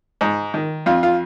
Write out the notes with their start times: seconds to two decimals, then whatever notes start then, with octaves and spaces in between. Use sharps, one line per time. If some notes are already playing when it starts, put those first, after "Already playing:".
0.21 G#2
0.54 D#3
0.86 F2 F4
1.03 F4